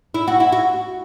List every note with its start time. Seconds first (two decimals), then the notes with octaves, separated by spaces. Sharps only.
0.14 E4
0.28 F#4
0.40 E4
0.52 F#4